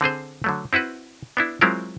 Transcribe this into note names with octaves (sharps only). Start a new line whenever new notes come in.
D3 C4 G#4 C5
D3 F#3 A3
C4 E4 F#4 B4
B3 D4 E4
F#3 G#3 C4 E4 F4 A#4